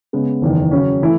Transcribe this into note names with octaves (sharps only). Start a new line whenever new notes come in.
C#3 G#3 B3
F#1 E2 D#3
C#3 F#3 C#4
E3 A3 E4